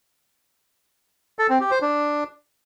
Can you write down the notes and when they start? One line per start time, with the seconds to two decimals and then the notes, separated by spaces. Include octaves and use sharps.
1.39 A4
1.50 C4
1.60 G4
1.71 C5
1.82 D4